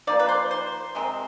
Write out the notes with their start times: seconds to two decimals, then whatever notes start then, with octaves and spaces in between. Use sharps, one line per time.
0.07 F3 A#3 D#4 D5
0.19 B4
0.29 C5
0.51 C5
0.95 C3 D#3 G#3 C4